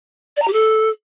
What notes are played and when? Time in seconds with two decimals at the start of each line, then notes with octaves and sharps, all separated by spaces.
0.37 D5
0.42 A#5
0.48 G4
0.53 A4